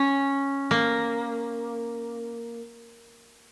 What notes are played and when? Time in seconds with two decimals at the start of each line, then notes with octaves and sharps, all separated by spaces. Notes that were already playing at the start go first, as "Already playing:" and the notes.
Already playing: C#4
0.71 A#3